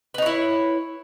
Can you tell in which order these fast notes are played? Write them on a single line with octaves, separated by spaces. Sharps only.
B4 D#4 C#5 E4